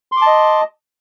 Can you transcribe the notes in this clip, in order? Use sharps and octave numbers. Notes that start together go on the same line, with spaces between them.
D#5 A5 C6 D6